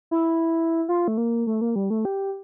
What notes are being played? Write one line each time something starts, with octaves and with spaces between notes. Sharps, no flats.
E4
F4
A3
A#3
A3
A#3
G3
A3
G4